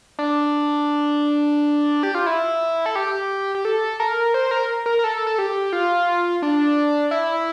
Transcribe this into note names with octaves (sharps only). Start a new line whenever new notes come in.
D4
G4
F4
E4
A4
G4
G4
A4
A#4
C5
A#4
A#4
A#4
A4
A4
G4
F4
D4
E4